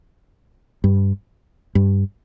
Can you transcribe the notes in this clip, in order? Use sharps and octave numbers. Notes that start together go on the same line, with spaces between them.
G2
G2